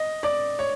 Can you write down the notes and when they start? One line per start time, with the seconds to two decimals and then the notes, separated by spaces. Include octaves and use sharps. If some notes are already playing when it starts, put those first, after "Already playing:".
Already playing: D#5
0.23 D5
0.59 C#5